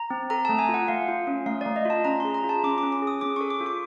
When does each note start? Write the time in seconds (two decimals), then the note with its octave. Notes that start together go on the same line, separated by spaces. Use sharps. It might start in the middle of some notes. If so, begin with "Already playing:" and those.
Already playing: A#5
0.10 C4
0.30 A4 A#5
0.45 A3 A5
0.59 G#5
0.69 F4
0.74 F#5
0.88 A3 F5
1.08 F4
1.27 C#4
1.46 A3 F5
1.61 A3 D5
1.76 D#5
1.85 F4 A5
2.05 C#4 A#5
2.20 G#4 C6
2.34 A#5
2.44 F4
2.49 A5
2.64 C#4 D6
2.78 D6
2.83 C#4
2.92 D6
3.02 G#4
3.07 D#6
3.21 C#4 D6
3.36 A4 C#6
3.50 D6
3.60 F4
3.66 D6